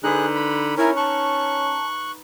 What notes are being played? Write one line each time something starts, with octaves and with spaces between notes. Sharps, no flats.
D3 D#4 G#4 B4 F#6
B5
C#4 E4 A#4 G#5
A5 C#6 F#6